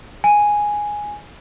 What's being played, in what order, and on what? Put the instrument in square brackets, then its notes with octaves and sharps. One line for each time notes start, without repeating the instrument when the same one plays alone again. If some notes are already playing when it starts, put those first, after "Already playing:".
[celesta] G#5